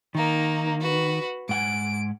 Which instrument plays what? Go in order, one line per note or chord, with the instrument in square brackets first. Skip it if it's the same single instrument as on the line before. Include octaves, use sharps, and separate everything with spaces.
[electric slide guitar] D#3 [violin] A#3 D#4
[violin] F#4 B4
[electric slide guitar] G#2 F#5 G#5 [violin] D7